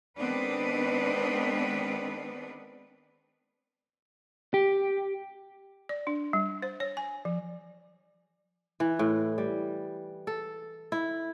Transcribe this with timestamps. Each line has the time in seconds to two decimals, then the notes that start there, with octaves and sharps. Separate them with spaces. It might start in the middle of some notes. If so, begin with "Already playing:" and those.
0.17 D#3 G#3 B3 C4 D4 B4
4.54 G4
5.89 D5
6.07 D4
6.33 G3
6.62 C5
6.80 C#5
6.97 G#5
7.25 F3
8.80 E3
8.99 A2
9.38 G3
10.27 A4
10.92 E4